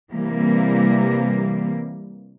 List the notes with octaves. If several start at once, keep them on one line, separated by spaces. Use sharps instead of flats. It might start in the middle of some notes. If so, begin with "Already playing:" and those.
C3 E3 G3 A#3